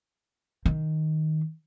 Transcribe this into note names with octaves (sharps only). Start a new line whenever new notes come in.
D#3